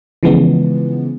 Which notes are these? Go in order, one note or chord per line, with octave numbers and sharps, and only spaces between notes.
C#3 E3 F3 G#3 B3